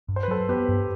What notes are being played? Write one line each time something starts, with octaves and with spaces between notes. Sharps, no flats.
G2
C5
B4
F#3 A4 C5
B3 G4 B4
G2